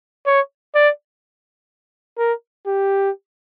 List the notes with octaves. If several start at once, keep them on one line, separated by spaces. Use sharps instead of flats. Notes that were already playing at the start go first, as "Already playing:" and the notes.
C#5
D5
A#4
G4